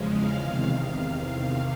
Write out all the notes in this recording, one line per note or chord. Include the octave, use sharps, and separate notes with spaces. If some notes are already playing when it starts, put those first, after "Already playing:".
Already playing: E2 C#3 F3 G#3
F5
E2 C3 D#3 F5